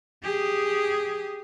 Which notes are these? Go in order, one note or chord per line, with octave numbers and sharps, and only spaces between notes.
G4 G#4